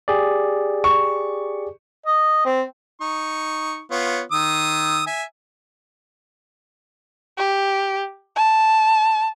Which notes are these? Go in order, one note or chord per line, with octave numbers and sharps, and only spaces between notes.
G4 G#4 D5
C#6
D#5
C4
D#4 C#6
B3 F4 C#5
D#3 D#6 E6
E5 G#5
G4
A5